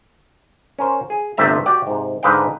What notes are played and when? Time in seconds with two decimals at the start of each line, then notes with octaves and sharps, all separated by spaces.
0.79 C#4 A#4 C5
1.10 G#4
1.37 G1 C3 A3 C4 E5 A#5
1.66 F#4 G4 D5
1.87 G#2 C3
2.23 G#2 D3 B4 D#5 F5 G5